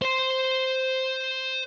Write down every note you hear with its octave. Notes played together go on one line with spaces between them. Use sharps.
C5 C6